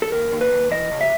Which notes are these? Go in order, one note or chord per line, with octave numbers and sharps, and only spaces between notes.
A4
D#2 A#4
D#2
B4
D#2
E3 D#5
C#3
E5